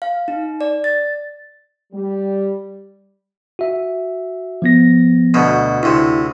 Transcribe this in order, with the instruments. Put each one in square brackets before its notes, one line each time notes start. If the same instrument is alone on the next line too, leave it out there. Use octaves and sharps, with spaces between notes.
[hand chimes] F5
D#4
D5
A6
[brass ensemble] G3
[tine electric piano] F#4 E5
F3 B3 A#6
[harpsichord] D2 B2
[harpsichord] D2 C3 [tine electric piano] E4